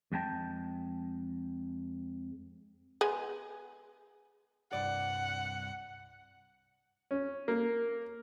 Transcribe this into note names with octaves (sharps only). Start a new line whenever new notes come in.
F2 G#3 G5 A5
G#3 B3 G#5
C2 G2 D5 F#5
C#4
A#3